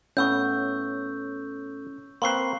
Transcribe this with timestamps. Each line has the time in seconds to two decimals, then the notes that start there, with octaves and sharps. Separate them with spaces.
0.17 A2 B3 C#4 C#6 E6 G6
2.22 A#3 C4 B4 C6 C#6 C7